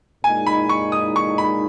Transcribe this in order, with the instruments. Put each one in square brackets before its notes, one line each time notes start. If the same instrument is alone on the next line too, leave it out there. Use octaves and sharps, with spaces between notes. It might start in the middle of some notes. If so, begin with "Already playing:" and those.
[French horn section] A#2 G#3 D#4 [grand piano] G#5
[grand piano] B5
C#6
D#6
C#6
B5